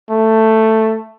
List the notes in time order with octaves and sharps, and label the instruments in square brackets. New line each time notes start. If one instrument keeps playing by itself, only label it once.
[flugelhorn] A3